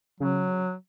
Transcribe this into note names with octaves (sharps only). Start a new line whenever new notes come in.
C#3 F#3